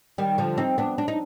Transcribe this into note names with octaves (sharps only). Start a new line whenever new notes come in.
D#3 G3
D3 F3
C4 D#4
B3 D4
D4
D#4